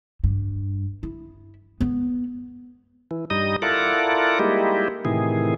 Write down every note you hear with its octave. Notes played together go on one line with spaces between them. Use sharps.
G2
E4
B3
E3
G2 G3 D#4 D#5 D#6
E4 F4 A4 A#4 D5 F#5
G3 G#3 A#3 D#4 E4 G4
A2 C3 D#3 E3 G#4